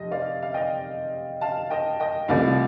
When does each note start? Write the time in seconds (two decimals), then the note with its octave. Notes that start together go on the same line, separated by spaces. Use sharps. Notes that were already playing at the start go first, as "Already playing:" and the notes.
Already playing: F1 C3 D#5
0.11 D5 F5
0.43 F5
0.54 D#5 G5
1.41 F5 A5
1.70 D#5 G5
2.00 D#5 G5
2.28 C2 C3 F3 A3 D5 F5